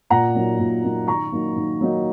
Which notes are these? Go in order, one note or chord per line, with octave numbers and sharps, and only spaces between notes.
A#2 F#5 A#5
F#3 A#3 D#4
A#2
F#3 A#3 D#4
D#3 A#5 C#6
F#3 A#3 D#4
D#3
F#3 A#3 D#4